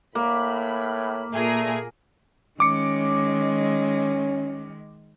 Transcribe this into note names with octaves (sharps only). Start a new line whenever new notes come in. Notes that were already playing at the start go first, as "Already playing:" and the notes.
A2 A#3 B5
A#2 A3 G#4 A#4
D#3 G#3 C#4 D6 C#7